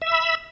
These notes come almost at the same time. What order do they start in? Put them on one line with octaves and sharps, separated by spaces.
E5 E6 B5